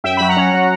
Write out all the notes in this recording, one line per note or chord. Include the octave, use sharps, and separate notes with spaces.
F#2 E5 G5
F#3 B5
F#5 A#5
C#4
F#3